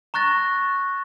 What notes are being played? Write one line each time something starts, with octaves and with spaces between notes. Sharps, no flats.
A#5 C#6 F#6 A6 A#6